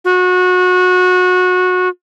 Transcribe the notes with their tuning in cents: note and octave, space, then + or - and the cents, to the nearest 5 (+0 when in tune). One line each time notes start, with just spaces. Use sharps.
F#4 -25